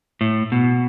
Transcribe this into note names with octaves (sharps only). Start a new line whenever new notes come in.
A2
B2